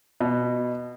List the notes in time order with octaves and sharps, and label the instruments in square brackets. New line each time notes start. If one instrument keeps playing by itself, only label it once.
[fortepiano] B2